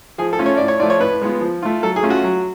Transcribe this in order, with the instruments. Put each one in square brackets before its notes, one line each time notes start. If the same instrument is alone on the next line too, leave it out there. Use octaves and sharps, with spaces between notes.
[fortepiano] F3 G#4
A4
A3 C#4 F4
C#5
A2 D5
C#5
F3 A3 F4 D5
C#5
A2 B4
G#3 B3 F4
F3
A3 F4
F#3 A4
G#4
A3 C#4 F4
F#4
F#3